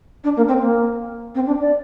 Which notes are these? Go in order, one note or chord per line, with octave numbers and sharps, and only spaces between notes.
D4
A#3
C4
A#3
C4
D4
D5